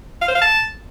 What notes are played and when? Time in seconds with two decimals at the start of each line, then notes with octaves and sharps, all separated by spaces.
0.22 F5
0.28 C5
0.35 F5
0.42 A5